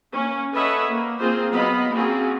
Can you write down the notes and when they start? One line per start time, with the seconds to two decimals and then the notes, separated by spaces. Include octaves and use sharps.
0.13 A#3 C#4
0.53 A4 B4 C#5 D#5 E5 F#5
0.88 A#3
1.20 A#3 C4 F4 G#4 C5
1.52 F#3 B3 D#5 F5 B5
1.92 A#3 C4 C#4 F4 F#4 G#4